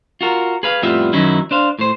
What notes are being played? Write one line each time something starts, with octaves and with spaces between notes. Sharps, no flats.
F4 F#4 A#4
G#4 B4 F5
F2 A2 G3 B3 F4 E5
F#2 D#3 F#3 C#4 D#4 E4
D4 C5 F5
A2 C5